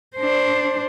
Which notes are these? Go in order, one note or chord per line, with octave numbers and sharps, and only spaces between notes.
D4 C5